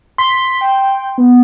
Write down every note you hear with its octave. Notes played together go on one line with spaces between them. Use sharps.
C6 B6
G5
B3